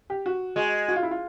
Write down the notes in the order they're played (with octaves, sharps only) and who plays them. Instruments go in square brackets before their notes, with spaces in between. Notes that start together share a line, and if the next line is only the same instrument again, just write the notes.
[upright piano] G4
F#4
[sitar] G#3 [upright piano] F#4
[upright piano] F#4
F4
E4
F4